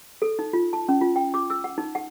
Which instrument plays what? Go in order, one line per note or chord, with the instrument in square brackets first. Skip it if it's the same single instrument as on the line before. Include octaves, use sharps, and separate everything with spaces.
[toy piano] A4
D#4
F4
A5
C#4
F4
G5
D6
E6
F#5
D#4
F#5